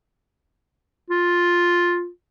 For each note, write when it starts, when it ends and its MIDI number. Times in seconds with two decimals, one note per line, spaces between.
1.10 2.08 65